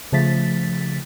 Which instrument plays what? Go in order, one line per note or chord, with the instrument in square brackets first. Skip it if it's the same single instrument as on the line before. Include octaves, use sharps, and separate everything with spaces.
[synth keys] C#3 F3 A3 A6 B6